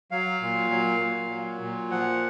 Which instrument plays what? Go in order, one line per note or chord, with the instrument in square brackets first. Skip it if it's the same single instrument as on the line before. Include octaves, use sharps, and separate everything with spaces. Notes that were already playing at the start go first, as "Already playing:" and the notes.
[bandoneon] F#3 F5
A#2
F#3
A#2
F#3
A#2
F3 F#5